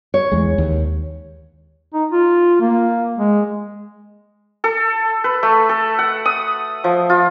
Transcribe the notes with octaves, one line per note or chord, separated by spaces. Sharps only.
C#5
E2 G#3
D#2
D#4
F4
A#3
G#3
A4
B4
A3
A4
F#5
D#6
F3
F4